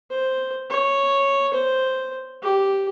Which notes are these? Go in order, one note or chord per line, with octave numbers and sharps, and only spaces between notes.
C5
C#5
C5
G4